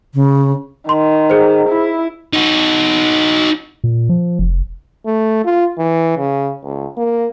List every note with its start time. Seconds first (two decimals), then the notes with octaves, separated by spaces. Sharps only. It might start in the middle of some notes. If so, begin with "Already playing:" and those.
0.14 C#3
0.89 D#3 C6
1.30 G#4 C5
1.69 E4
2.33 D#4 F#4
3.84 A#2
4.09 F3
4.39 F1
5.06 A3
5.45 F4
5.78 E3
6.17 C#3
6.64 C#2
6.97 A#3